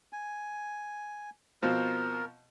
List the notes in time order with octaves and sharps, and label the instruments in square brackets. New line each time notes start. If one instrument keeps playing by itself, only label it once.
[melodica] G#5
[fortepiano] B2 F3 C4 [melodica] A#4